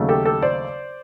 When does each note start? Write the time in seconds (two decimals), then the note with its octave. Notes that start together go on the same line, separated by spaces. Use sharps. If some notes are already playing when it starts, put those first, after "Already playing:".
Already playing: D#2 C#3 F#3 A3
0.09 G4 A4
0.25 G4 A4
0.42 C5 D5